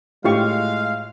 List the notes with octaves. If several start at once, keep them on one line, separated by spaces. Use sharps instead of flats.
A2 G#3 F4 G4 F5 C#6